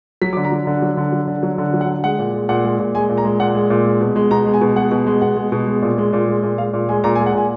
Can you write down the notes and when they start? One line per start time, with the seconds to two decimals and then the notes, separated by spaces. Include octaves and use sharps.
0.22 F#3 B6
0.33 D6
0.37 D3
0.45 A#5
0.52 F#3
0.67 D3
0.82 F#3
0.97 D3
1.13 F#3
1.28 D3
1.43 F#3
1.58 D3
1.74 F#3
1.81 F#5
1.88 D3
2.03 G#3 F#5
2.19 A#2
2.34 G#3
2.49 A#2 F#5
2.64 G#3
2.79 A#2
2.95 G#3 G#5
3.09 A#2
3.18 A#5
3.25 G#3
3.40 A#2 F#5
3.55 G#3
3.70 A#2
3.85 G#3
4.01 B2
4.16 G#3
4.31 B2 A#5
4.46 G#3
4.53 G#5
4.61 B2
4.76 G#3 F#5
4.91 B2
5.06 G#3
5.22 B2 F#5
5.37 G#3
5.52 B2
5.67 G#3
5.82 A#2
5.98 G#3
6.13 A#2
6.28 G#3
6.43 A#2
6.58 G#3 F5
6.73 A#2
6.89 G#3 G#5
7.04 A#2 A#5
7.15 G#5
7.19 G#3
7.26 F#5
7.34 A#2 G#5